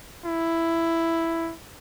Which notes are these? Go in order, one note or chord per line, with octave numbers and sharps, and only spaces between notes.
E4